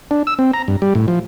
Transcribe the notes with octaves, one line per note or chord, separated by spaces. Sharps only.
D4
E6
C4
A#5
G2
G3
A2
F3